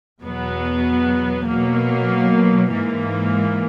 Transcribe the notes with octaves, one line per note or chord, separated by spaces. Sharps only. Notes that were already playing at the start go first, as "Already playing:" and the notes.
E2 B2 F#3 B3
B2 F#3 A#3
G#2 E3 A#3